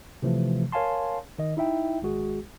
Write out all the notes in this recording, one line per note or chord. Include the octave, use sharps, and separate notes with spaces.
C3 E3 F3 A3
A#4 C#5 F5 G#5 A5 C6
D#3 D#5
D#4 E4 E5 G5
G#1 G#3 F#4 G#4